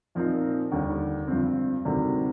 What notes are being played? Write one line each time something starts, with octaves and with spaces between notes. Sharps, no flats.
A#2 F3 C4 D#4
D#2 D3 G3
G2 F3 C4
D2 C3 D#3 G3